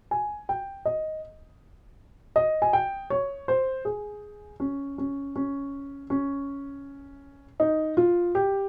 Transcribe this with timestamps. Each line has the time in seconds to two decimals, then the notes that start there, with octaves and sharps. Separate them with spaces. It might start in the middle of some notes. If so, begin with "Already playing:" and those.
0.11 G#5
0.49 G5
0.85 D#5
2.36 D#5
2.62 G#5
2.73 G5
3.10 C#5
3.48 C5
3.85 G#4
4.60 C#4
4.98 C#4
5.36 C#4
6.10 C#4
7.60 D#4
7.97 F4
8.35 G4